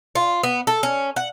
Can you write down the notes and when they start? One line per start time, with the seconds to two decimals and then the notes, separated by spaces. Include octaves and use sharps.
0.15 F4
0.43 B3
0.67 A4
0.83 C#4
1.16 F#5